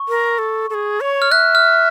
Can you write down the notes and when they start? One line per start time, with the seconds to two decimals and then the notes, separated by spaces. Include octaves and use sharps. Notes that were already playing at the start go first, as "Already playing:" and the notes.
Already playing: C#6
0.09 A#4
0.38 A4
0.70 A4
0.74 G#4
1.01 C#5
1.22 F6
1.31 E5 F#6
1.55 F6